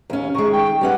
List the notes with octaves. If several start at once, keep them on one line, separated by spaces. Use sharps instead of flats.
D#2 C#4
D#3 G#3 C#6
G5
G3 C#4 B4 F#5